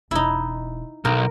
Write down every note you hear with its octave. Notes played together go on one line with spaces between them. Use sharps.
E1 D#4 E4
B1 D#4 A#4